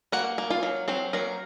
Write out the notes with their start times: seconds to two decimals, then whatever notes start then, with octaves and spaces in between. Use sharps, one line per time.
0.12 A#3 F#4 F#5
0.38 A#3
0.50 F4 F5
0.63 F#3
0.88 F#3 C4 C5
1.13 F#3 A#3 A#4